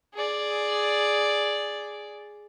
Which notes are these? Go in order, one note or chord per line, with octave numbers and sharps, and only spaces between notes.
G#4 D5